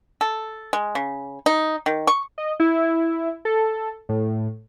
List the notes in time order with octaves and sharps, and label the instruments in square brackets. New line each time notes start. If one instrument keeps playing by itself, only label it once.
[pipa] A4
G#3
C#3
D#4
D#3
C#6
[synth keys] D#5
E4
A4
A2